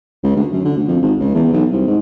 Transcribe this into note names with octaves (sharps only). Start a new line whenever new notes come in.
C#2
D2
F#2
D3
D2
F2
G#1
C#2
E2
B1
C2
G#2